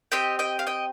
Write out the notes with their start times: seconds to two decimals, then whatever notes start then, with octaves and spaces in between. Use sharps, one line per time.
0.12 C4 G4 D#5 G5
0.39 D#5 G5
0.59 F5
0.67 D#5 G5